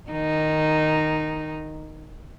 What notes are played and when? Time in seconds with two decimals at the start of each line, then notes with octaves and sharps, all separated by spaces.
0.10 D#3 D#4